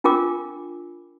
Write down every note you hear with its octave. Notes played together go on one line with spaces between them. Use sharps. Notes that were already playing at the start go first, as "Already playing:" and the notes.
D4 F4 A#4 G5 D6